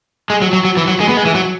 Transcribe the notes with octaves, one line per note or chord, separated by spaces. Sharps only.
G#3
F#3
F#3
F#3
E3
F#3
G#3
B3
G#3
E3
F#3